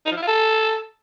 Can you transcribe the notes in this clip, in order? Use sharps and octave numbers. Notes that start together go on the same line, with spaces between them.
D#4
F3
E4
F4
A4